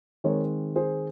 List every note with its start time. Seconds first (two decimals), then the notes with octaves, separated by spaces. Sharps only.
0.24 D#3 G#3 C4 A#4 C#5
0.76 G#4 C5